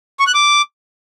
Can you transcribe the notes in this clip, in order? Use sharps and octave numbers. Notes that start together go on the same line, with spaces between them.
C#6
F#6
D6